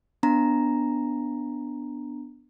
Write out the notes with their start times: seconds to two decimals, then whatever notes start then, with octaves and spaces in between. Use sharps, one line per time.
0.23 B3 D4 A#5